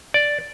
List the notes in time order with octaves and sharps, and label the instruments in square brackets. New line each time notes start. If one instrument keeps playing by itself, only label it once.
[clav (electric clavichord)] D5